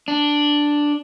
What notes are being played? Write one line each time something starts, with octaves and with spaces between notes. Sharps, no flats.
D4